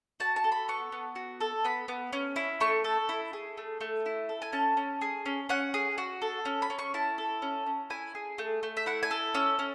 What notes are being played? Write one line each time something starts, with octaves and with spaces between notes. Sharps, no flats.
F#4 A5
A5
A4
B5
B3 C#6
B3
F#4
A4
B3 B5
B3
C#4
E4
A3 C#6
A4
E4
G#4
A3
A3
E4
A4
G#5
C#4 A5
C#4
G#4
C#4
C#4 F#5
G#4
F#4
A4
C#4
B5
C#4
C#6
E4 A5
A4
C#4
C#4
E4 G#5
G#4
A3
A3
E5
E4 F#5
G#5
A4
C#4 E6
C#4